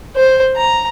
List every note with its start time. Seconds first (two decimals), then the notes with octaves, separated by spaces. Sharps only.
0.15 C5
0.57 A#5